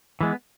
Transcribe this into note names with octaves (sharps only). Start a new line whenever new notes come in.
E3 G#3 B3